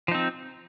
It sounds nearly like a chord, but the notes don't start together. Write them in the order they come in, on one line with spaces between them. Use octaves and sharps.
F3 D#4 C4